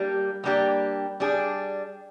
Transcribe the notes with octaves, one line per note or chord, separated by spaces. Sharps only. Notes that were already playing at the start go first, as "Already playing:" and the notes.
Already playing: G3 A#3 D4 G4
G3 A#3 D4 G4
G3 D4 G#4